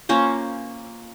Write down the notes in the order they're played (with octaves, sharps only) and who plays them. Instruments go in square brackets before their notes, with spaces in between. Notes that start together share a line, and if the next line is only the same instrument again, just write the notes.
[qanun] A#3 C#4 F4 C5